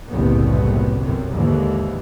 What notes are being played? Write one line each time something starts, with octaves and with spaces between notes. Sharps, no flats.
F#1 C2 A2 C3 B3
G1 F#2 C3
D#2 G#2 D3 E3